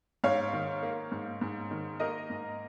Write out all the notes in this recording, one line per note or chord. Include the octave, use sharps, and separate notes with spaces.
G#2 C#5 F5
D#3
A#3
G#2
G#2
D#3
A#3 A#4 D#5
G#2